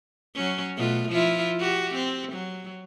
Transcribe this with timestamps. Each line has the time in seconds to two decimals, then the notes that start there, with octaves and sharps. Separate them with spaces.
0.35 F#3 C#4
0.77 B2 A3 F4
1.11 F3 E4 F4
1.59 F#4 G4
1.95 C4
2.33 F#3